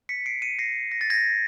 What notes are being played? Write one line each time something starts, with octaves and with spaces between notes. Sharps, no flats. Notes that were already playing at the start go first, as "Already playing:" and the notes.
B6 C#7
C7 D7
C#7 D#7
A#6 C7
A#6
A6
G#6 A#6